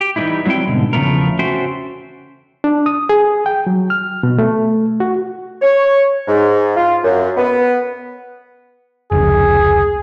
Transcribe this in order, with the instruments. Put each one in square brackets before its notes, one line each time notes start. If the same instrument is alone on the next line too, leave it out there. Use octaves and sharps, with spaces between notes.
[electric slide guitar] G4
E3 G3 A#3 C#4 D#4 E4
F#3 G3 C4 E4 G5
G#2 B2 D3
E2 C#3 F3 A3 B3 A#4
C#4 F#4 A4 C5 E5 G5
[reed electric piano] D4
D#6
G#4
G5
F#3
F6
B2
A3
F#4
[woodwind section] C#5
G#2
F4
F#2
B3
[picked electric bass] F1 C#2 [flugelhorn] G#4